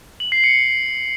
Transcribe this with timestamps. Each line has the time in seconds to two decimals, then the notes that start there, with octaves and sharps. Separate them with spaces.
0.20 F#7
0.32 C7
0.44 C#7